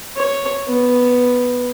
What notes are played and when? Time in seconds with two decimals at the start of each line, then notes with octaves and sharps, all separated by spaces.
0.17 C#5
0.68 B3